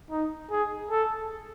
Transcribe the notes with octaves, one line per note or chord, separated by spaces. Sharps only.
D#4
G#4
A4